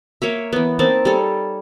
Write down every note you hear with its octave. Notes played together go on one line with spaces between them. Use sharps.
A#3 C#5 E5
E3 B3
A#3 C4 D#4 A5
G3 A4 C#5